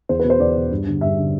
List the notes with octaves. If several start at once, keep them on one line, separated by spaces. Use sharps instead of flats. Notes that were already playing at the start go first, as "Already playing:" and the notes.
E2 C5
B4
B2
C5
E2 D5
B2
G2
D3
G2 E5
D3